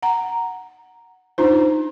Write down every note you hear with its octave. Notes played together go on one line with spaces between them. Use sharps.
F#5 A#5
D4 D#4 F4 C5